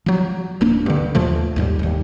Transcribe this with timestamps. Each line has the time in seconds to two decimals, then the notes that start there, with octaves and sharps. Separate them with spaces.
0.06 F3 F#3
0.61 D1 A#3 D4
0.86 G2 D3
1.15 D#2 A#2 F3 A3
1.56 D#2 G#2 G3
1.79 F1 D#2